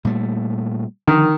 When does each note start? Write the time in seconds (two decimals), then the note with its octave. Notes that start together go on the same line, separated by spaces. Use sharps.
0.05 A#2 G3 A3
1.08 D3 D#3 F3